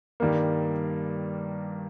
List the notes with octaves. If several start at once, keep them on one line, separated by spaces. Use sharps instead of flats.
G2 D#3 G3 A#3